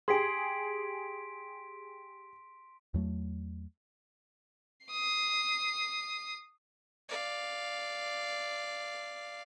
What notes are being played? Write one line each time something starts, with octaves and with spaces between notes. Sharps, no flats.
G4 G#4 C6 B6 D7
E2 F#3 A3
D#6 C7
D5 F5